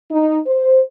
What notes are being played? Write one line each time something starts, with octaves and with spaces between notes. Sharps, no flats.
D#4
C5